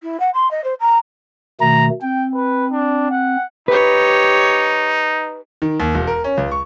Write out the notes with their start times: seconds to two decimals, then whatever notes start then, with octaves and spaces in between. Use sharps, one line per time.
0.02 E4
0.19 F#5
0.34 C6
0.51 D#5
0.64 C5
0.80 A#5
1.61 B2 D#3 A3 A#5
2.02 C4 G5
2.34 B4
2.71 D4
3.10 F#5
3.68 D#4 G4 B4 C#5
5.62 D#3
5.80 D#2
5.94 E1
6.07 A#4
6.24 C#4
6.37 C#2
6.51 C#6